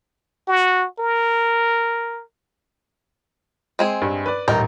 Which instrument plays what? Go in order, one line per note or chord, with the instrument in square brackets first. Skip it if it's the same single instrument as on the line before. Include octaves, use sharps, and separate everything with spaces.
[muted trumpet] F#4
A#4
[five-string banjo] G#3 C4 G#4
[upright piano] G2
B4 D5
[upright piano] D#1 A1 A#4 [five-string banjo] D#4